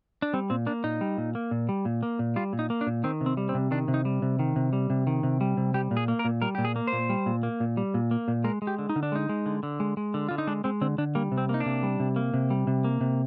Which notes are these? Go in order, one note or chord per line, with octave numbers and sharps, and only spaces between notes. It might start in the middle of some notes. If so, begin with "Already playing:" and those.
D4
G3 C4
A#2 C4
A#3 D4
A#2 D#4
G3
A#2
A#3
A#2
G3
A#2
A#3
A#2
G3 F4
A#2
D#4
A#3
D4
A#2
D#3 C4
C3
C4
G3
C4
C3
D#3 D4
C3
D#4
G3
C3
D#3
C3
G3
C3
D#3
C3
G3
C3
G3 G4
A#2
G#4
A#3
A#4
A#2
G3 A#4
A#2 G4
G#4
A#3
C5
A#2
G3
A#2
A#3
A#2
G3
A#2
A#3
A#2
G#3 A#4
G#3
G4
D3
D#4
D3
D4
G#3 D#4
G#3
D3
D3
G#3
G#3
D3
D3 F4
D#4
G#3 D4
G#3 C4
D3 C4
D3 D4
G3 A#3
C3
C4
A#3 D#4
D4
C3
G3
C3
A#3
C3
G3
C3
A#3
C3